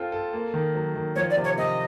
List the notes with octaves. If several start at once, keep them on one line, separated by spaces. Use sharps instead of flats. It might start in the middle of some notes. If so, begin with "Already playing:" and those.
Already playing: C4 F4 A4
A4
A#3
D#3
F#3
D#3
F3 C#5
D5
C3
C#5
C3 D#5